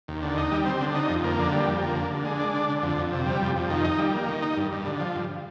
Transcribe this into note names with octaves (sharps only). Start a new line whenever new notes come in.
D#2
D3
D#4
G3
C4
D3
D#4
F2
A#3
D3
G3
F2
A#3
D3
D3
G#3
D4
D3
D3
F2
F2
C3
G3
F2
F2
D#3
D#4
G3
A#3
D#3
D#4
G2
G2
D3
F3
G2